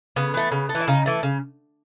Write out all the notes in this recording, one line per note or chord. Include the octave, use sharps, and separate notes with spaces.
C#3 B3
E3 A3
C#3
A3
E3
E4
C#3 D#4
E3 A3
C#3